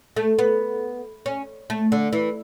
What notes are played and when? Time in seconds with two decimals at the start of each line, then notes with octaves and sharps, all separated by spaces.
0.16 A3
0.39 B3
1.26 C#4
1.70 A3
1.92 D3
2.13 E3